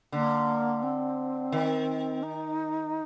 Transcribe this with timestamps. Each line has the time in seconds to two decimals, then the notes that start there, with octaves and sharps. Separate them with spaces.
0.12 D3 A#3
0.83 C4
1.52 D#3
2.23 D#4